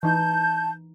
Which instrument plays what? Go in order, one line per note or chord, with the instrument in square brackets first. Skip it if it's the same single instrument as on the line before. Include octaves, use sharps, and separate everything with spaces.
[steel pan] E3 D#4 [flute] A5 [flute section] G6